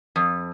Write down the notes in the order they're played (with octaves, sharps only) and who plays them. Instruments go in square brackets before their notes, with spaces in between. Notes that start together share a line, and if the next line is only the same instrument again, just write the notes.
[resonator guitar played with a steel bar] F2